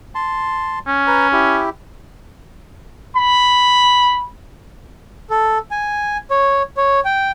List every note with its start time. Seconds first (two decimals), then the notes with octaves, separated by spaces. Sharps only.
0.15 A5 C6
0.87 C#4
1.07 B4 A#5
1.33 E4 G4
3.16 B5
5.30 A4
5.71 G#5
6.31 C#5
6.77 C#5
7.05 G5